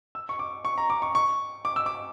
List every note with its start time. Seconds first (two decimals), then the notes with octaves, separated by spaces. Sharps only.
0.15 E6
0.29 C#6
0.39 D6
0.65 C#6
0.78 A#5
0.90 D6
1.02 C#6
1.15 C#6
1.65 D6
1.76 E6
1.86 D6